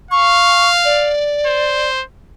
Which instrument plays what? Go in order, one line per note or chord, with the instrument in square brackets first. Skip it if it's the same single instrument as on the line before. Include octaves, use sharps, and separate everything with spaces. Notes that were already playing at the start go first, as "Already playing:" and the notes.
[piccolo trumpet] F5 [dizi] C#6
[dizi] D5
[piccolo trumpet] C5